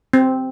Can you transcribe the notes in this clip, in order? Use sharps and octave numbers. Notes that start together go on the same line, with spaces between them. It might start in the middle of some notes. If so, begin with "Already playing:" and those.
C4